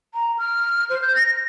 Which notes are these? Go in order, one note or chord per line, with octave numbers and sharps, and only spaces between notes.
A#5
F6
C5
G6
A#6